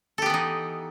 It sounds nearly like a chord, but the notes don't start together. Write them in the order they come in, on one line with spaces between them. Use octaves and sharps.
A4 G4 B3 E3 D#4